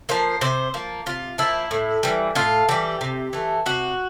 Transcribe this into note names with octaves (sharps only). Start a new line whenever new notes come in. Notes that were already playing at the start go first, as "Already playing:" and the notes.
F3 A#3 C5
C3 C5
F3 A#3
C3 F4
F3 A#3 E4
A2
E3 G3
A2 F4
E3 G3 G4
C3
E3 A3
C3 F#4